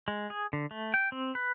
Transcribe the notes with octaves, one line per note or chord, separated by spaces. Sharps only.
G#3
G#4
D3
A3
G5
C4
B4